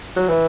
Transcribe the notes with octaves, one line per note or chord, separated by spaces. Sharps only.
F#3
E3